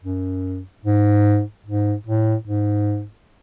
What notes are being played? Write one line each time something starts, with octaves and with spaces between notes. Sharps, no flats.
F#2
G#2
G#2
A2
G#2